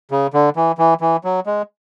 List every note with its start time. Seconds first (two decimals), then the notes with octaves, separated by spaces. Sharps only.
0.11 C#3
0.34 D3
0.56 E3
0.78 E3
1.01 E3
1.24 F#3
1.46 G#3